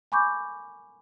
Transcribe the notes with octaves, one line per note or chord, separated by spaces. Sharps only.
G#5 B5 C#6 D6 G6